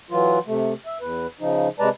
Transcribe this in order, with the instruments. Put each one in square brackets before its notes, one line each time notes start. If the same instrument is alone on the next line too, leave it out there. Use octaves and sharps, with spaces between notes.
[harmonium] E3 F#3 F4
C3 A3
E5
E2 B4
C#3 F3 D#4
C3 G#3 B4 D5 A5 A#5